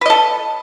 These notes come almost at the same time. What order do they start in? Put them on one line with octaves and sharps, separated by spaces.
B4 D#5 A4